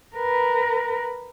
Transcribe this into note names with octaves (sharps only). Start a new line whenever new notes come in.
A#4 B4